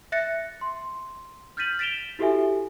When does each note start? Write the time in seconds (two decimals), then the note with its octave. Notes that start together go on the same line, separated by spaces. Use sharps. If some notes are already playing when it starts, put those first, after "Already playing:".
0.12 E5 F#6 A6 A#6 C#7
0.61 C6
1.57 F6 G6 A6 B6 D#7 F#7
1.79 A6 B6 D7 E7 F7 G7
2.19 E4 F#4 G4 A4 E5 G#5